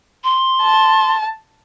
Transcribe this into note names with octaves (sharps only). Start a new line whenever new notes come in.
C6
A5